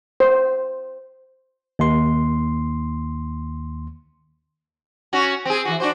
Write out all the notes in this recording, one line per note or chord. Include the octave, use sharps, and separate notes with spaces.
C5
D#2 C6
C#4 F#4
C4 G#4
E3 F#4
D4 F#4 C5